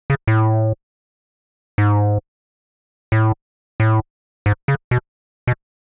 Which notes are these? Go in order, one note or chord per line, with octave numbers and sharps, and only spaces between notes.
C#3
A2
G#2
A2
A2
G#2
C#3
B2
B2